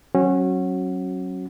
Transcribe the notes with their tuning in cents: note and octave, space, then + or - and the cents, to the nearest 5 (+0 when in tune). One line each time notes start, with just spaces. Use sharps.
F#3 +15 C#4 -25 F#4 +0